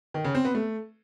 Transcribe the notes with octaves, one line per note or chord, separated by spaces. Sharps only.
D#3
C#3
C4
B3
A3